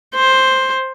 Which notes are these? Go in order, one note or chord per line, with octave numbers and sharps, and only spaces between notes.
C5